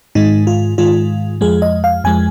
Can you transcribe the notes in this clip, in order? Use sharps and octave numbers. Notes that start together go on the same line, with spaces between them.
G#2 D#3 G#3 D#4
F4
G#2 D#3 G#3 F4
F2 F3 G#3 G#4
D#5
F5
F2 F3 G#3 G#5